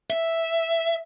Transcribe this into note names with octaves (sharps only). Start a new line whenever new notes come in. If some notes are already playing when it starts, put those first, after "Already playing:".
E5